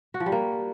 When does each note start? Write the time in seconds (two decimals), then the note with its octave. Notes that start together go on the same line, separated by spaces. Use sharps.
0.14 F#4
0.20 F3
0.26 G3
0.32 A#3